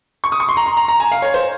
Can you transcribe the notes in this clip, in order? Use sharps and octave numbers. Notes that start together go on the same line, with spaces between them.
C#6
D#6
C#6
C6
A#5
C6
A#5
A#5
G#5
F5
C#5
C5